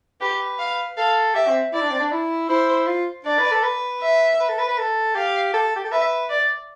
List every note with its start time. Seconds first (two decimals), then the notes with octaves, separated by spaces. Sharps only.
0.21 G4 B4
0.59 F5
0.97 A4 F5
1.35 G4 E5
1.48 C4
1.73 E4 D5
1.81 D4
1.91 C4
2.00 D4
2.12 E4
2.49 E4 C5
2.87 F4
3.25 D4 D5
3.38 B4
3.51 A4
3.63 B4
4.01 E5
4.40 B4
4.49 A4
4.58 B4
4.69 B4
4.78 A4
5.15 G4 F5
5.54 A4
5.76 G4
5.84 A4
5.92 B4 E5
6.30 D5